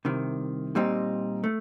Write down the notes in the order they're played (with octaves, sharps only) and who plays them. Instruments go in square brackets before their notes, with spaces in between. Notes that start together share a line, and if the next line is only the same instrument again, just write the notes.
[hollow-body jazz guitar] C2 C3 D#3
A#2 G3 C4 D#4
A3